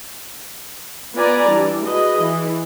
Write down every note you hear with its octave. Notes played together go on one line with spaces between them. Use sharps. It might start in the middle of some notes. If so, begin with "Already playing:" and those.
B3 F4 B4 D5 G#5 A#5
E3 G3 D4
F#4 G#4 B4 D#5
E3